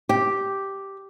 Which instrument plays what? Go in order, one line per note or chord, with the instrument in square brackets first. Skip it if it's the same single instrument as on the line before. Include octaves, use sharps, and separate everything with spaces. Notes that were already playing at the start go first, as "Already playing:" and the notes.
[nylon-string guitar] G4